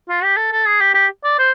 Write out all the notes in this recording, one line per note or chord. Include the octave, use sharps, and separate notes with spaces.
F4
G4
A4
A4
G#4
G4
G4
D5
C5